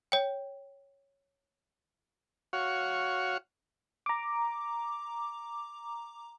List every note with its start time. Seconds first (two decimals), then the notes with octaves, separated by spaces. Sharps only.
0.12 C#5 G5
2.53 F#4 C#5 F5
4.06 A#5 D6